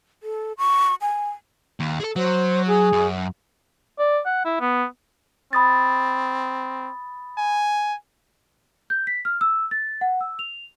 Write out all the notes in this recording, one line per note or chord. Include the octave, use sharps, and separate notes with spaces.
A4
C#6
G#5
D#2
G#4 A4
F#3 C5
G#4
F#2
D5
F#5
E4
B3
C4 B5 D#6 A6
G#5
G6
B6
F6
E6
A6
F#5
E6
F7